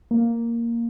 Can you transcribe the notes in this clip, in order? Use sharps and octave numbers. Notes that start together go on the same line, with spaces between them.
A#3